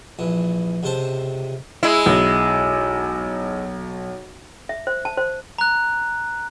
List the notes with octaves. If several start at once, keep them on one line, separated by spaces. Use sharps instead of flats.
A#1 E3
C#2 C3 C5 A5
G#3 E4
B1
E5
C5
A5
C5
A#5 F#6